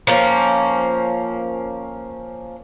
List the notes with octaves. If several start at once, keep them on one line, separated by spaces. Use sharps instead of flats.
F3 A#3 C#4